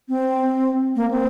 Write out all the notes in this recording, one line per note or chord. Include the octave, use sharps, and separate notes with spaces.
C4
A#3
C4